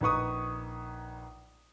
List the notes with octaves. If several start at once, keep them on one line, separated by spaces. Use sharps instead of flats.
A#1 D#4 B4 C#6 D#6